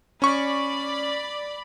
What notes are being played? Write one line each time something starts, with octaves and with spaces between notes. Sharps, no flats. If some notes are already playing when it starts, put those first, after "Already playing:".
C#4 D5 B5 C#6